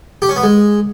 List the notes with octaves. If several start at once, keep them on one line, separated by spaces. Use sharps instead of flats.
G4
C#4
B3
G#3